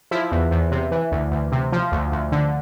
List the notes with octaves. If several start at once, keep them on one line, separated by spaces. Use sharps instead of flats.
F3 E4
E2
E2
C3
E3
D2
D2
C3
F3
D2
D2
D3